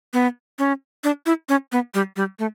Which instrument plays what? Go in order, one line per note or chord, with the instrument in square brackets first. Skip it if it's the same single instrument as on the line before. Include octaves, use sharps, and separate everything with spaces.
[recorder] B3
C#4
D4
E4
C#4
B3
G3
G3
A3